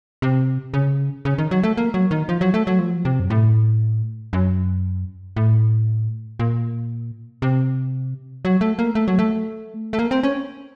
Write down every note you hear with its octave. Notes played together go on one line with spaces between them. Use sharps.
C3
C#3
C#3
D#3
F#3
A3
A#3
F#3
D#3
F3
F#3
A3
F#3
F3
C3
F#2
A2
F#2
A2
A#2
C3
F#3
A3
A#3
A3
F#3
A3
A3
A#3
C4
C#4